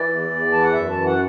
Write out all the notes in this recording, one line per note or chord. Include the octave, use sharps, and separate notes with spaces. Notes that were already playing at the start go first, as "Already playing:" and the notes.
Already playing: E3 D5
E2
E2
E3 A5
F#5
F#2 E5
E3 A5
F#5